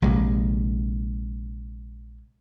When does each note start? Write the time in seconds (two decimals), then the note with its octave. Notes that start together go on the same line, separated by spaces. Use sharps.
0.02 A#1 C3 G#3